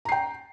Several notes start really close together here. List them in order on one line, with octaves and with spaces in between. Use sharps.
A#5 C7 G5